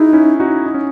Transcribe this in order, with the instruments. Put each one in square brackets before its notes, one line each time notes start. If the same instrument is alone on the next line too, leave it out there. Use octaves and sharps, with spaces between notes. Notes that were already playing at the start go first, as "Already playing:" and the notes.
Already playing: [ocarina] D#4 [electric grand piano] E4 F#4 G#4
[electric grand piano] C#4 E4
D#4 F#4
D#4
C#4